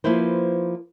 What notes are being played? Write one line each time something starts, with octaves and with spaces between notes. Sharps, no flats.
F3 A#3 E4 B4 C5